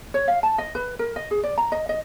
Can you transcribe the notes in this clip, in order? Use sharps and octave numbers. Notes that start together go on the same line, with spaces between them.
C#5
F5
A5
D#5
B4
A#4
D#5
G#4
D5
A#5
D#5
D#5